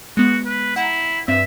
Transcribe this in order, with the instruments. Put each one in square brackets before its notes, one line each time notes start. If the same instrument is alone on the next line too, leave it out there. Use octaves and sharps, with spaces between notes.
[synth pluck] G#3 B3 [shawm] F#4
[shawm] B4
[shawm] E4 [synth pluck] F#5 A#5
[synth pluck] G2 C4 [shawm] E5